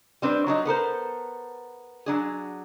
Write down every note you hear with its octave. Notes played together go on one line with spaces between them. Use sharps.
G3 C4 D4 B4
F#3 D4 D#4
B3 A4 A#4 C5
F#3 D4 G#4